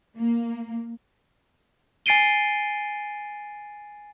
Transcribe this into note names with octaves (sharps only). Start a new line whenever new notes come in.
A#3
G#5 A6 C7 D7 D#7 G7